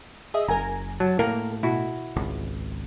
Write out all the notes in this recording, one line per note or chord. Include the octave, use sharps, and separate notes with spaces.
G#4 D#5 E5
F#1 A#4 G#5 A#5
F#3 A5
A2 A#3 A#4
B2 E4 F#4
G#1 C#2